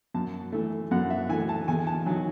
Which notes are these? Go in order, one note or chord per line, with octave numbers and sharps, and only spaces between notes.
F#2 A5
E3 A3
F#2 F#5
E5
E3 A3 G#5
A5
E2 G#5
A5
D#3 F#3 G#5